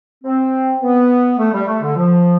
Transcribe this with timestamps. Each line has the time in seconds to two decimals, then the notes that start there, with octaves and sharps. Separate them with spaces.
0.24 C4
0.82 B3
1.38 A3
1.53 G3
1.67 A3
1.82 D3
1.96 F3